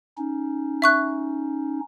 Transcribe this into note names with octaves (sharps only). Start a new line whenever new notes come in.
C#4 D#4
E5 C#6 F#6